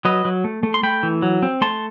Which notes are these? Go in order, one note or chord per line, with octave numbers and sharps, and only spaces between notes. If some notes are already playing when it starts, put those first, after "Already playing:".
F#3 B4 D#5
F#3
A3
A3
C6
A3 G5 B5
E3
F#3
C4
A3 A5 C6